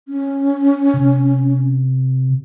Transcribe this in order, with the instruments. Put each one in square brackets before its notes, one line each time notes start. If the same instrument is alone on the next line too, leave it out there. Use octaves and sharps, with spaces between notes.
[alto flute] C#4
[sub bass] C3